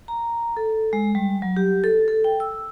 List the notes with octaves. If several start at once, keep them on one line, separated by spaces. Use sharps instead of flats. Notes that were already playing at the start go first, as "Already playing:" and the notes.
A#5
A4
G#3
G3
F#3
G4
A4
A4
G5
E6